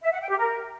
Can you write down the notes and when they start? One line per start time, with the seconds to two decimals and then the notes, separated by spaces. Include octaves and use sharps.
0.03 E5
0.12 F#5
0.21 G5
0.30 G4
0.38 A#4